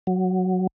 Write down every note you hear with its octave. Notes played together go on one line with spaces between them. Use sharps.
F#3